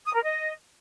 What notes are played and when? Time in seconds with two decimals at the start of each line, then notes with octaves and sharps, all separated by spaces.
0.05 D#6
0.14 A#4
0.23 D#5